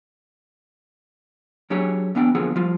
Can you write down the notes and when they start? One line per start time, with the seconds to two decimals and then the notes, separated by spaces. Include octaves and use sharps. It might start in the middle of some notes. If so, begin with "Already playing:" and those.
1.70 F#3 D4 G4 G#4 C#5
2.15 E2 B3 D4 F#5 G5
2.35 E2 D3 F3 A#3 G#4 F#5
2.56 F3 G3 F4